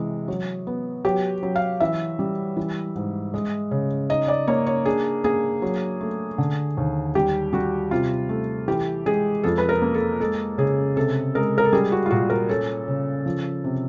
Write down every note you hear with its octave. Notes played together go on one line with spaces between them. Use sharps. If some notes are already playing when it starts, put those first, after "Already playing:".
Already playing: C3 E3 G#3
F#3
B3
F#3 G4
F#3
F5
E3 E5
G3
E3
G#2
G#3
C#3
D#4 D#5
D5
A#3 C#5
C#5
D4 G#4
A#3 G#4
F#3
A3
D3
D#2
G3 G4
G3 F#4
C3 F4
A3
E3 G4
G#3 G#4
F2 A4
B4
A#4
A#3
A4
G#3 A4
C#3 G#4
C3 A4
G#3 A#4
A#4
A4
G3 G#4
F#4
F4
A#2 F#4
A#4
C#4 A4
C#3
F3
C3